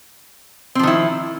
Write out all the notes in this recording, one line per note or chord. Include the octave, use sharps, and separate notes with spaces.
D#3 F3 C4 E4